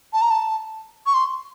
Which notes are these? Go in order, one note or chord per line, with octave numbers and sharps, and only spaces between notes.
A5
A#5
A5
C#6
C6